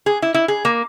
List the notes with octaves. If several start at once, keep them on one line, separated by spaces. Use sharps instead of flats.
G#4
E4
E4
G#4
A#3